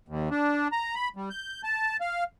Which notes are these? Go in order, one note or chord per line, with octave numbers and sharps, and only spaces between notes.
D#2
D4
A#5
B5
G3
G6
A5
F5